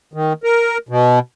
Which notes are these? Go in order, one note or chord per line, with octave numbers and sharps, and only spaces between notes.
D#3
A#4
B2